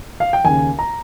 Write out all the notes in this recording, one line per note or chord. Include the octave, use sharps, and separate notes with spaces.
F5
G5
D#2 C#3 G#5
A#5